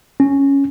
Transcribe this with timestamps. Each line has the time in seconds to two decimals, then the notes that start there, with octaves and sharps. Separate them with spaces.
0.20 C#4